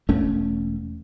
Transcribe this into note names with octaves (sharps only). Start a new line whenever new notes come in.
E1 A3 C#4